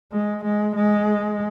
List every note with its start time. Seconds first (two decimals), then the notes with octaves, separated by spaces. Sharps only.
0.12 G#3
0.44 G#3
0.76 G#3